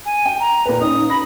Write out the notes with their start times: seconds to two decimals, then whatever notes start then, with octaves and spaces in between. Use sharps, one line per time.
0.06 G#5
0.26 G5
0.40 A#5
0.65 A#2 B4
0.81 C#4 D#4 D#6
1.10 B5 A#6